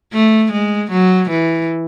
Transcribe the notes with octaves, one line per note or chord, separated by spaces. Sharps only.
A3
G#3
F#3
E3